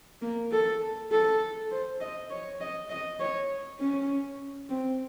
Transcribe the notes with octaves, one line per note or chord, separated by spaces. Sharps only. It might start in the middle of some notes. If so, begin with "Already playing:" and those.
A#3
A4
A4
C5
D#5
C#5
D#5
D#5
C#5
C#4
C4